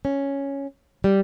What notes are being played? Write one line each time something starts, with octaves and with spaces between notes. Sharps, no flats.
C#4
G3